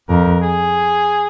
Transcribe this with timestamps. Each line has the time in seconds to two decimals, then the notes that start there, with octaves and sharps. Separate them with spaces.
0.09 F2 A#4
0.42 G#4